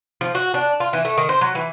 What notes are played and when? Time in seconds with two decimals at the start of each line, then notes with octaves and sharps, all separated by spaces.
0.21 F3
0.35 F#4
0.54 D4
0.80 F4
0.93 E3
1.05 A3
1.18 D#3
1.29 C5
1.41 F#3
1.55 E3